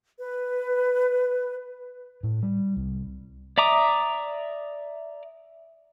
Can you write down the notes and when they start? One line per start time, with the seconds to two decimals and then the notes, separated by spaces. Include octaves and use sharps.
0.18 B4
2.23 A2
2.43 G3
2.76 C2
3.58 D5 E5 A#5 D6 D#6